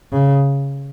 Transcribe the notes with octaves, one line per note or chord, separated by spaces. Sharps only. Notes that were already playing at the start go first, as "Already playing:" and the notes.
C#3